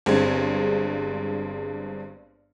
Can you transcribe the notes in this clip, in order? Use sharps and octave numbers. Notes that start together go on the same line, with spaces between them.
G1 G2 G#3 C4 G#6